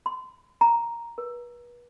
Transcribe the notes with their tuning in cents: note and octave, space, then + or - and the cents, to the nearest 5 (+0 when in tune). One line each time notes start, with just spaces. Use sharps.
C6 -30
A#5 +0
B4 -35